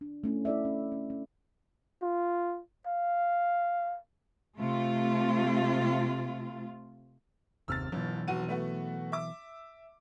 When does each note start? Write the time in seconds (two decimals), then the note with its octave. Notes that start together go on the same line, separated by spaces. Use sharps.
0.01 D4
0.24 A3 C#4 E4
0.45 E4 A4 D5 E5
0.65 C#4
0.92 C#4
1.10 C#4
2.02 F4
2.87 F5
4.58 C3 A3 F4
7.68 F#1 D#2 C3 E6 F6 A6
7.92 G1 B2 E3 F#3
8.28 F1 F#4 D#7
8.48 A3 B3 F#4
9.12 E5 D6